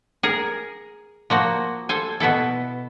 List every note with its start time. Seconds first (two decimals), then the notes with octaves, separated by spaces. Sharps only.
0.23 G#4 A#4
1.30 F3 A#3 F#4
1.89 A4 C5 G#5
2.20 B2 B3 E4 A4